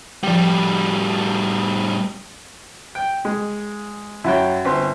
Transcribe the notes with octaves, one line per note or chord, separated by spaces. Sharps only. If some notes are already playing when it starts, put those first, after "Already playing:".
A2 F3 G3 G5
G5
G#3
F#2 E4 F#4 C#5 G5
G1 C4 C6